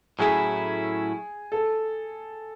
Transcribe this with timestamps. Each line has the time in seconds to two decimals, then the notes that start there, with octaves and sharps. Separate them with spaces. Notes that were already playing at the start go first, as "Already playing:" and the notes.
0.19 A2 F#3 A3 C#4 E4 G#4
1.52 A4